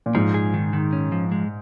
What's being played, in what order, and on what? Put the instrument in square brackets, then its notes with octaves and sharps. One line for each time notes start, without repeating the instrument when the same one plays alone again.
[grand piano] A#2
[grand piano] G#2 [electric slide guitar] F3
[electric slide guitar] G#4
D#3
D#3
C#4
F3
G#3